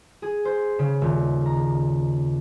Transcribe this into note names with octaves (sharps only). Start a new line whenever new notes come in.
G#4
C5
C#3
D#1
A#5